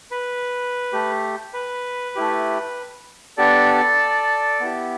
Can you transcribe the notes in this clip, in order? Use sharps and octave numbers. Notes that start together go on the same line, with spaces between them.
B4
A3 G4
B4
A3 E4 G4
B3 D4 G4 A4 D5
B3 E4 G4